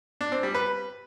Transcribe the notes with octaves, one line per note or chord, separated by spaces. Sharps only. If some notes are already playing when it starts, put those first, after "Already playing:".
D4
C4
G3
B4